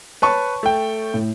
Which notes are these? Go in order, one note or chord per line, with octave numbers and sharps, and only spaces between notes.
B4 C#5 A5 C#6
A3 G5
A2